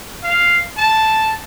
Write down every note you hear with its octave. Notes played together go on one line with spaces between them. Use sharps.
F5
A5